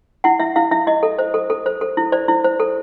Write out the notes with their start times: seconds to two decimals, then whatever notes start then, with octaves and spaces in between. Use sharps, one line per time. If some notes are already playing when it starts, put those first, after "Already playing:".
0.24 E4 F#5
0.40 E4 E5
0.56 E4 F5
0.71 E4 E5
0.87 E4 D#5
1.03 A4
1.19 C5
1.34 A4
1.50 A4
1.66 C5
1.81 A4
1.97 E4
2.12 C5 D5
2.28 E4
2.44 C5
2.60 A4